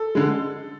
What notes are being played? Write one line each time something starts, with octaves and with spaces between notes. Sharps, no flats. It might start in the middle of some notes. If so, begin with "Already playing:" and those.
Already playing: A4
D3 G#3